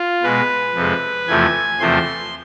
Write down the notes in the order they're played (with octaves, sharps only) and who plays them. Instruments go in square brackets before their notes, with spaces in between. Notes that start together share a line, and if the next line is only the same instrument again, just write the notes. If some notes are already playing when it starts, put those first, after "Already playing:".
Already playing: [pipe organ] F4
B2 G#3 B4
F2 C3 G#3
E2 C3 F3 A3 G#5
E2 C3 F3 A3 C6